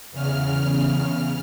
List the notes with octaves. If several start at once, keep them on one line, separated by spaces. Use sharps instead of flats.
E2 C#3 F6